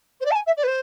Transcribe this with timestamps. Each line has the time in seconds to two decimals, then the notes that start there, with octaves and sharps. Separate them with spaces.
0.20 C5
0.25 D5
0.31 A5
0.35 G#5
0.46 E5
0.57 D5
0.63 B4
0.67 C5